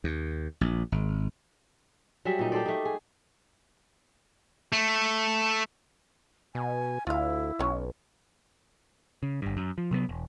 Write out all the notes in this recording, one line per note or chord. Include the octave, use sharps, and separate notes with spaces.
D#2
A#1
G#1
F#3 G3 G#4 E5
A#2 D#4
G4 A4 C5 D5
A3 D#4
G#4
A3
B2 G#5
D2 E4 F4 F5
B1 F#3 C#4 C#5
C#3
G1 G2
F#2
F3
C3 F#3 G3 B3
E1